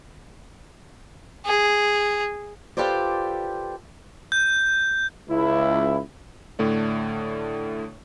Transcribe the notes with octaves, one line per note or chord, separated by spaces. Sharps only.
G#4
F4 G4 A4 B4 C5 D5
G6
C#2 E4
A2 D3 A3 D5